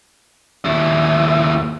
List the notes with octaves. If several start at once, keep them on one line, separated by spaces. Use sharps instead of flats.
D#2 E4